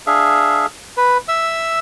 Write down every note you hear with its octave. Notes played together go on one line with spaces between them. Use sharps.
D4 G#4 E5 F5
B4
E5 E6